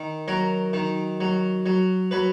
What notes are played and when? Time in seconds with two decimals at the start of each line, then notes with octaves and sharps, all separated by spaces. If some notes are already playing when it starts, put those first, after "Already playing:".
Already playing: D#3
0.28 F#3 A#4
0.73 D#3
1.20 F#3
1.66 F#3
2.11 F#3 B4